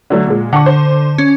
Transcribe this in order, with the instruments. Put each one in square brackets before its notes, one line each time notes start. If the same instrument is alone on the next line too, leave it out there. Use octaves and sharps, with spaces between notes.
[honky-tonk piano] D3 F#3 A3
A#2 G#3
[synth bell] D3 [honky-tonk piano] F#5 C#6
[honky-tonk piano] C5
[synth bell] C#4